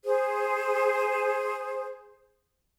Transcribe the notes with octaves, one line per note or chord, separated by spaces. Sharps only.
G#4 C5